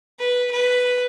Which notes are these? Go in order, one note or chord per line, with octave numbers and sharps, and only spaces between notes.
B4
B4